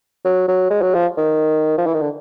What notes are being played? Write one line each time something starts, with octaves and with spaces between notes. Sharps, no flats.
F#3
F#3
G#3
F#3
F3
D#3
F3
E3
D#3
D3